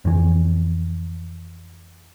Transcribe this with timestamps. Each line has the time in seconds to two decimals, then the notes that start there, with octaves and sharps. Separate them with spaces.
0.05 F2 E3